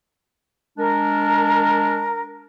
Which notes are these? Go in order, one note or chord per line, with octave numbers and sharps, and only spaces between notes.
G#3 D4 A#4